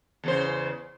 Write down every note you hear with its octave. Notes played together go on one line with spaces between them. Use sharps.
E2 C#3 C5